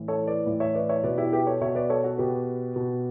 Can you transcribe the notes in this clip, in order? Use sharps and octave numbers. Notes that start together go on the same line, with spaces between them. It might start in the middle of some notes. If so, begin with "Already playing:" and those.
Already playing: A2 E3
A4 C#5
B4 D5
A2 E3
C#5 E5
B4 D5
C#5 E5
B2 B4 D5
E4 G4
G4 B4
A4 C#5
B2 C#5 E5
B4 D5
A4 C#5
F#4 A4
B2 G4 B4
B2